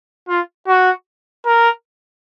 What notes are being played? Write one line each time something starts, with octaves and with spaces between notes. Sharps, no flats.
F4
F#4
A#4